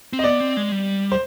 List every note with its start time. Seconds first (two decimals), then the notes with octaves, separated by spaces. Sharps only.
0.13 C4
0.19 D#5
0.24 B3 D5
0.40 C4
0.57 G#3
0.72 G3
1.12 C5